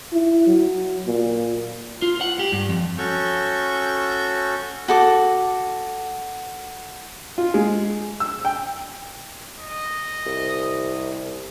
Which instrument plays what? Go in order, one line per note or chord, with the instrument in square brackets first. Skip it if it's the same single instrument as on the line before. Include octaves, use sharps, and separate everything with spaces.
[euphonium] E4
F#3
A#2
[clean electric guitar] F4
F#5
G4
G2
F2
[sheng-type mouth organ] C#4 F#4 A4 C#6 G6
[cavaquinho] F#4 A4 D6
[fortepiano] F4
G#3
E6
G5
[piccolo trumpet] D#5
[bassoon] C2